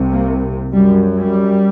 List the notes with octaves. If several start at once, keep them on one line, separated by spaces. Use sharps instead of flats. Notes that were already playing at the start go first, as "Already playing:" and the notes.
Already playing: C2 C3
A#3
F#2 G3
G3